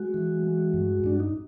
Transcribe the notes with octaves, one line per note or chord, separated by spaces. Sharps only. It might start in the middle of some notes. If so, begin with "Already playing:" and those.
Already playing: G#3 F#4
E3
G#3
G2
G2 D4
D#4